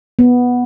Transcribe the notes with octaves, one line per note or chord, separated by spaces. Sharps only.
B3